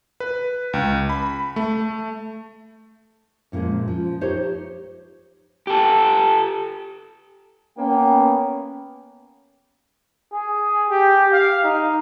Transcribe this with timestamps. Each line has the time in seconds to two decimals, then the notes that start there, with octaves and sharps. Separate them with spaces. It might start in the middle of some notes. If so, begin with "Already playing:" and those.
0.20 B4
0.73 C#2
1.10 B5
1.56 A3
3.52 F#2 A#2 D#3 F3 G#3
3.88 F3
4.21 D#4 G4 C5 C#5
5.67 G4 A4
7.78 A#3 B3 C#4 G5
10.33 G#4
10.90 G4
11.33 F5
11.64 D#4